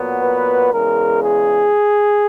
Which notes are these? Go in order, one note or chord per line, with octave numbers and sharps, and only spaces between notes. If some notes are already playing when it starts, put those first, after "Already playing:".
Already playing: A#2 F#3 B3
B4
E2 C#3 G#3 A#4
G#4